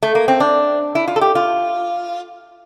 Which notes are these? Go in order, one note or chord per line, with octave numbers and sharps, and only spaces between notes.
A3
A#3
C4
D4
E4
F4
A4
G4
F4